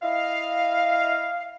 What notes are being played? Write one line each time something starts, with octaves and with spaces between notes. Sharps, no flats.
E4 D#5 F5